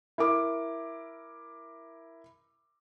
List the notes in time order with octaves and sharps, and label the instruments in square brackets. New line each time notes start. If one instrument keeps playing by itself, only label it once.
[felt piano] E4 A#4 D6